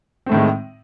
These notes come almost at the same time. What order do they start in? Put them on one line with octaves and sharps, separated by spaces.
C4 A3 A2 D#3 G#3